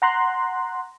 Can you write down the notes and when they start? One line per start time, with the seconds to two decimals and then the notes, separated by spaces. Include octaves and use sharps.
0.02 F#5 A#5 C6 F#6